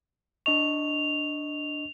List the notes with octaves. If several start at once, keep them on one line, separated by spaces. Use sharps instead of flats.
D4 D#5 C#6 F7